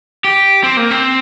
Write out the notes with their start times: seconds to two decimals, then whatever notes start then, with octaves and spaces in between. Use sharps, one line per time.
0.24 G4
0.63 C4
0.77 A#3
0.91 C4